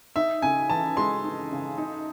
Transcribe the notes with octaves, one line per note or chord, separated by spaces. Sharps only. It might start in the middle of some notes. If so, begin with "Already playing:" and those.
D#4 E5
C#3 G#5
E3 A5
G#3 C6
D#4
C#3
D#4